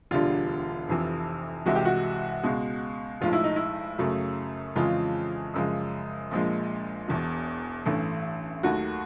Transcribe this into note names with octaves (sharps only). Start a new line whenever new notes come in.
E1 D2 D3 G3 F4
F1 F2 C3 E3
C2 C3 E3 G#3 F#4
G4
F#4
C#2 B2 G#3
B1 A2 F3 G#3 F4
E4
D#4
E4
F#2 C#3 F#3 A3
F2 C#3 E3 G#3 F4
F#2 C#3 F3 G#3
A#1 A#2 F3 G#3
E1 E2 B2
A1 G2 E3 A3
D#2 D#3 F#3 A3 F#4